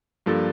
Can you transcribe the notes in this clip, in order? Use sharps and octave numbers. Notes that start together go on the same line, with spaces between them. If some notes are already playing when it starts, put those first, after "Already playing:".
G2 F3 A#3 F4 A4